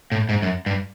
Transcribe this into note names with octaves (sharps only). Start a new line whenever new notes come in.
A2
G#2
F#2
G2